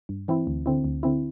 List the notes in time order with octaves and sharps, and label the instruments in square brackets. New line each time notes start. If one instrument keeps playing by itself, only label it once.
[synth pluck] G2
E3 C4 E4
D2
D3 C4 E4
D2
D3 C4 E4